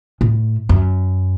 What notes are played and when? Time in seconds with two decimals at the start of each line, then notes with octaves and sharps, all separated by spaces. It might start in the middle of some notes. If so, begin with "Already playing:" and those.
0.21 A2
0.69 F#2